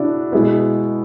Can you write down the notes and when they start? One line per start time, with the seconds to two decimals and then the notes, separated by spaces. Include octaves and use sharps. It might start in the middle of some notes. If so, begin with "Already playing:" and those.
Already playing: C#3 D4 E4 F#4
0.32 B2 G#3 B3 E4